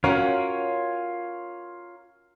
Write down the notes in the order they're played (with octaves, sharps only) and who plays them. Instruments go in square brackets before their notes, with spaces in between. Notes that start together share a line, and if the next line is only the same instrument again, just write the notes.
[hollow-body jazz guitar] C#4 F#4 [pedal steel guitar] F4 A#4 C#5